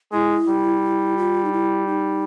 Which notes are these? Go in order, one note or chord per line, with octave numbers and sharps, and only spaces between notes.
G#3 E4
G3
F4
D#4
E4
D#4